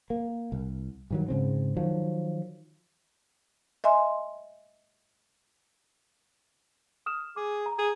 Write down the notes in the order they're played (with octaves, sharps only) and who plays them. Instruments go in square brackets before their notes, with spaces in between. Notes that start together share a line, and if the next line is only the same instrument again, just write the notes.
[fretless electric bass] A#3
C2
G2 D#3 F#3
G#2 C#3 C4
D#3 F3 F#3
[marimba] D#5 E5 G#5 C6
[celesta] D#6 F6 E7
[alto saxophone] G#4 [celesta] D6
[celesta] A#5
[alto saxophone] G#4